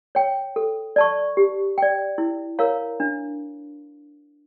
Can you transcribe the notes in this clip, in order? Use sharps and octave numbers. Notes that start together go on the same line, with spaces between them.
C#5 G5
A4
D5 A5 C#6
G4
D5 G5
E4
A#4 C#5 F5 A#5
D4